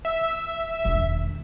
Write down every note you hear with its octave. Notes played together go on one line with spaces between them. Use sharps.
E5
E1 D#3